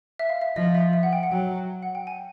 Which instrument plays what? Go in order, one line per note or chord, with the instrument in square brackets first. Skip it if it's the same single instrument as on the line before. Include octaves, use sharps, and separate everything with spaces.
[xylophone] E5
F5
E5
[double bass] F3 [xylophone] D#5
[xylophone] E5
E5
F#5
G5
F#5
[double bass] F#3 [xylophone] G5
[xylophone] F#5
G5
G#5